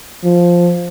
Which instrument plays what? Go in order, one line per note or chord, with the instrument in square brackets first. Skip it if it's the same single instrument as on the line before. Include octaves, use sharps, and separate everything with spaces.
[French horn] F3